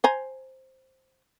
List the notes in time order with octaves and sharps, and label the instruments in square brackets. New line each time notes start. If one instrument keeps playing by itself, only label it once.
[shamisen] C5 G#5 A#5